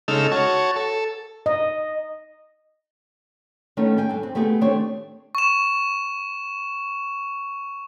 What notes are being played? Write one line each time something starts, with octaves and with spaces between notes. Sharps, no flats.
C#3 G#3 D#4 A4 E6 F6
F#4 C#5 A5
A4
D#5
D#3 A3 B3 C#4 D#4
G#4 G5 G#5
G2 A4
C4
A3 B3 G4 G#4
D#3 A3 C4 D4 G4 C#5
C#6 E7